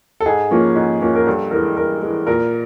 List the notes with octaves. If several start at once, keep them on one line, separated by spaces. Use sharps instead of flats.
A4
G#2 G#4
F3 A#3 C#4
G#2
F3 A#3 C#4
A#4
G2 A4
E3 G#3 A#4
G2 A#4
E3 G#3
A#2 A#4